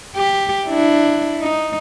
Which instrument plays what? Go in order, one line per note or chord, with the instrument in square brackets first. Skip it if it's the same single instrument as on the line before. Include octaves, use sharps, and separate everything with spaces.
[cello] G4
D4 E4
D#4